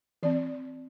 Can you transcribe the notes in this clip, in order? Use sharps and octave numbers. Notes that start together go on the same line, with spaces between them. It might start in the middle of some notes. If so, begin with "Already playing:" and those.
E3 C4 D5